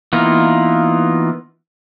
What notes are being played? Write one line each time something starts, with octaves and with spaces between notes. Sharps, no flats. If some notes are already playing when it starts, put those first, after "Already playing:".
E3 A#3 B3 D#4 F4